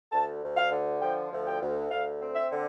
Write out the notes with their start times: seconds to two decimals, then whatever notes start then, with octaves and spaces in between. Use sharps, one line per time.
0.12 D2 A5
0.42 D2
0.57 F5
0.71 D3
1.01 F3 G5
1.31 D2
1.46 G5
1.61 D2
1.90 D2 F5
2.20 C4
2.35 E5
2.50 D3